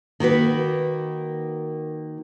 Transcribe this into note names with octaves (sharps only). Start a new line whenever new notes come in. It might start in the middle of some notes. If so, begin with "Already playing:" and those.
D#3 A#3 F#4 B4